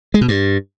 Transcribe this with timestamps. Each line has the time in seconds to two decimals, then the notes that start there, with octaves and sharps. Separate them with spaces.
0.14 G#3
0.21 B2
0.28 G2